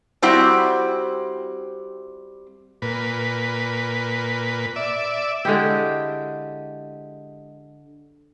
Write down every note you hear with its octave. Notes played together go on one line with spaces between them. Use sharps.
G3 C4 E4 F#4
A#2 B4
D5 E5
D3 G#3 E4 G4